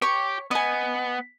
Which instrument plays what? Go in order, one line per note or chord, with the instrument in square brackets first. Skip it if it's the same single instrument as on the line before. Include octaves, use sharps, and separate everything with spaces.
[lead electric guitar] G4 [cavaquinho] C#5 C#6
[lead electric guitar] B3 [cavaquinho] D#5 G#5